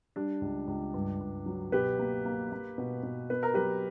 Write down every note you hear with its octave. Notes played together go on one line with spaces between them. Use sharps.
G3 D4
C#2
C#2
G2
G2
F#3
B2 G4 B4
A#3
A#3
A#3
B2
B2
B3 B4
A#4
F#3 G4 B4